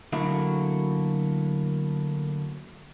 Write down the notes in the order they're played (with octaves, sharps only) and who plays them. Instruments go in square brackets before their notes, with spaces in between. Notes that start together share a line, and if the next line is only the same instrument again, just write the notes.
[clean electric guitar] D3 F#3 A3 A#3 E4 F#4